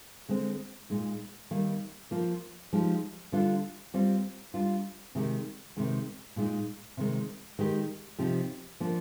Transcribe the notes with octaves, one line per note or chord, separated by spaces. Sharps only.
D3 G#3 C4
A#2 G#3 D#4
D#3 G3 A#3
F3 A#3 F4
F3 G#3 D#4 G4
D3 G3 D4 F4
G3 C4 F4
G3 D4 F4
C3 D#3 G#3 D#4 G4
C3 D#3 G#3
A#2 G#3 D#4
C3 D#3 G#3
D#3 G#3 D#4 G4
C3 F3 C4 D#4 G4
F3 A#3 D4